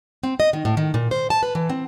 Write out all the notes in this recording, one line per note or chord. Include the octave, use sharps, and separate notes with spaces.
C4
D#5
D#3
A2
D#3
A#2
C5
A5
B4
E3
C4